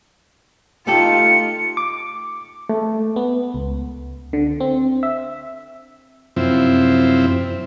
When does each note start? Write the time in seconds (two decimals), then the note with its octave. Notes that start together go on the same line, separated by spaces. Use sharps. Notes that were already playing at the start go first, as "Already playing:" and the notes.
0.87 A3 D#4 F4 G4 A4 C#7
1.77 D6
2.69 A3
3.16 B3
3.54 C#2
4.33 D3
4.60 C4
5.03 E5
6.36 F#2 C3 F3 C4 E4